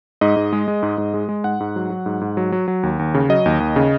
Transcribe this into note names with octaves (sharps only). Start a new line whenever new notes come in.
G#2 D#5
G#2
G#3
G#3
G#2
G#2
G#3
G#3
G#2 F#5
G#2
F#3
F#3
G#2
G#2
F#3
F#3
F#3
D#2
D#2
C#3
F#3 D#5
D#2
D#2
C#3